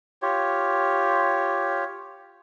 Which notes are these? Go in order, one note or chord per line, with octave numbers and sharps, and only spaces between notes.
F4 G4 C#5